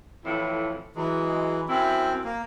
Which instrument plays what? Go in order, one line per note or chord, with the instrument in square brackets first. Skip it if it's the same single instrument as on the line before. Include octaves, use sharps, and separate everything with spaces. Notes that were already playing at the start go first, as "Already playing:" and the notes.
[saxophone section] F2 A2 E3
[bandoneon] E3 [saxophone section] F#3 G#3
[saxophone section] F#2 E4 [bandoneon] C4
[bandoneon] A#3